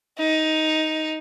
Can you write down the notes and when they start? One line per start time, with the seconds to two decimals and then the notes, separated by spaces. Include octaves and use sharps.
0.18 D#4